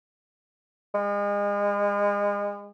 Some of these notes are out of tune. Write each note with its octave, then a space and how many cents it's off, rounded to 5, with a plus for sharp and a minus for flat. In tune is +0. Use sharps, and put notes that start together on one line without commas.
G#3 -35